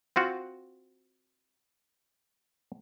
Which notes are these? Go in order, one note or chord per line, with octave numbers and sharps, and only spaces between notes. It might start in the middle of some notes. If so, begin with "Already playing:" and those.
C4 F4 F#4